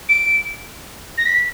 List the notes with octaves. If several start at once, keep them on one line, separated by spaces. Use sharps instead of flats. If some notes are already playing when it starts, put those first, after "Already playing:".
D7
A#6
B6